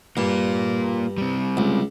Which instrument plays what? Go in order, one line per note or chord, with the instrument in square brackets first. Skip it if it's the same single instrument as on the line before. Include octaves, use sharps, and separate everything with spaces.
[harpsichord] G2 [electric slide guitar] A#3 F4
[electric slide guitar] G3 C4
[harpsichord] C#2